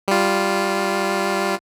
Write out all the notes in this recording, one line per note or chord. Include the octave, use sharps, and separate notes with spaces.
G3 F4